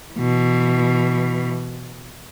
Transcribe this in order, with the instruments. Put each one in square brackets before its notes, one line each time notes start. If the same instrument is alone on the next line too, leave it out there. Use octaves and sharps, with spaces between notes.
[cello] B2 E3